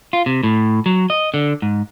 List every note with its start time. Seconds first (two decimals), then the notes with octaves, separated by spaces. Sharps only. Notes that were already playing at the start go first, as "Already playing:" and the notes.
0.13 F4
0.26 C3
0.43 A2
0.86 F#3
1.10 D#5
1.34 D3
1.62 G#2